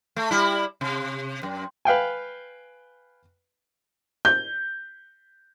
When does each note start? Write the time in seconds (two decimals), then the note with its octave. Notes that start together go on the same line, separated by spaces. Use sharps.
0.16 A3
0.31 G3 E4
0.81 C3
1.43 F#2
1.85 B4 F5 G5 G#5
4.25 G6